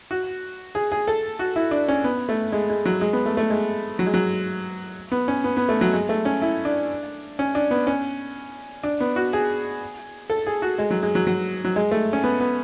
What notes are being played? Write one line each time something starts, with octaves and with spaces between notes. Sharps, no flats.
F#4
G#4
G#4
A4
F#4
E4
D4
C#4
B3
A3
G#3
G#3
F#3
G#3
B3
A3
A3
G#3
F#3
G#3
F#3
B3
C#4
B3
B3
A3
F#3
G#3
A3
C#4
E4
D4
C#4
D4
B3
C#4
D4
B3
F#4
G#4
A4
G#4
F#4
G#3
F#3
G#3
F#3
F#3
F#3
G#3
A3
C#4
B3
B3